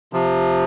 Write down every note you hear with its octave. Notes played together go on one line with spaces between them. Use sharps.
C3 F3